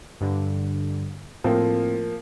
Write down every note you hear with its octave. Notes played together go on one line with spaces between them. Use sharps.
G2 D3
A2 F3 A#3 C4